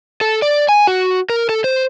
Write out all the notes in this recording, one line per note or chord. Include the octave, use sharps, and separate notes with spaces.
A4
D5
G#5
F#4
A#4
A4
C5